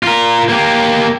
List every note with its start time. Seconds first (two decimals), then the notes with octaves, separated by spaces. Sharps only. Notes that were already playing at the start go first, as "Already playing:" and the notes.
0.03 F4 A#4
0.50 A#3 G4